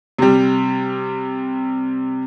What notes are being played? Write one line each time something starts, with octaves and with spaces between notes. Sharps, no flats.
C3 G3